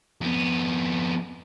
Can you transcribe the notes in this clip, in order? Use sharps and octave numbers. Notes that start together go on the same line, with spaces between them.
F2 B3